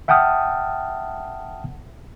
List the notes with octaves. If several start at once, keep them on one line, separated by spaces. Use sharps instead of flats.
E5 F#5 G5 A5 D#6 F6